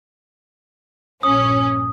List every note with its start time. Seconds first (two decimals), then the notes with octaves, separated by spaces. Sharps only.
1.23 A#1 G2 A#2 C#4 D#6